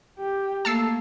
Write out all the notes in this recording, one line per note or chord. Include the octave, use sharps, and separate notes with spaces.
G4
A3 A#3 A5 E6 C7